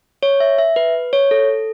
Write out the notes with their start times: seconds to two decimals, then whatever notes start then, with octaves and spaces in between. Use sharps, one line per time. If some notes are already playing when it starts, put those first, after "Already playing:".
0.23 C#5
0.40 E5
0.58 E5
0.76 B4
1.13 C#5
1.31 A4